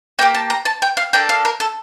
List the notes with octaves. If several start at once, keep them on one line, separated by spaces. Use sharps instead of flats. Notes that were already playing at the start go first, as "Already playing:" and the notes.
A#3 D4 G4 G5
A5
A#5
A5
G5
F5
A#3 D4 A4 G5
F5
A#4
A4